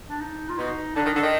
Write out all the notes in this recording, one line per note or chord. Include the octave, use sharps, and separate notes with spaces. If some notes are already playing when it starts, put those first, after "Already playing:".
D4
D#4
F4
B2 D#4
D3 D4
D#3
D3
D#3